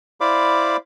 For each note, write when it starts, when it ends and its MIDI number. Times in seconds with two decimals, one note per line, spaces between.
0.21 0.77 64
0.21 0.77 72
0.21 0.77 74
0.21 0.77 77
0.21 0.77 83
0.21 0.77 86